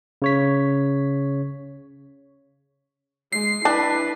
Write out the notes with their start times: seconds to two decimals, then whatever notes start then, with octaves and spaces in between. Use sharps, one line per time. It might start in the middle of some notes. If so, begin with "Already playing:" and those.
0.22 C#3 C#5 B6
3.33 G#3 C7
3.65 D4 E4 B4 A5